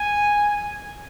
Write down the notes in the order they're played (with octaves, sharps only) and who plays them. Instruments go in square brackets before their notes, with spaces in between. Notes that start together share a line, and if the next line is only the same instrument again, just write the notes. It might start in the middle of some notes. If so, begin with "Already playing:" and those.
Already playing: [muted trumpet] G#5